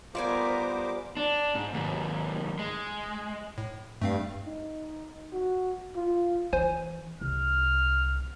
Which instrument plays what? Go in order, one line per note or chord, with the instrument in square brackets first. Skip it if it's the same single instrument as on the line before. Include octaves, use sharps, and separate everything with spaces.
[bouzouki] G3 D5 G#5 [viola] B3 A#4 [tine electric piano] F4 [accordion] C5 D6
[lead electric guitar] D4
G#2
D#2 G#2
G#3
[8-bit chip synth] A2
[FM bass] G2 [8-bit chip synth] A3 C4 F5
[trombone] D#4
F#4
F4
[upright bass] E3 [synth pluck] C5 G#5
[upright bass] C2 [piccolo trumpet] F6